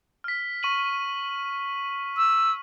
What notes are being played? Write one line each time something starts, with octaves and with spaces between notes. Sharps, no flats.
F6 B6
C#6 D#7 F#7
E6